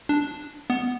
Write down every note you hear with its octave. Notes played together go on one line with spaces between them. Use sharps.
D4
B3